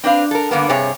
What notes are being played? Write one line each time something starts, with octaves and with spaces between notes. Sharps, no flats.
C4 D4 B4 F5
A4 A#4
G2 D3 A#3 B3
G2 C3 G#4 C#5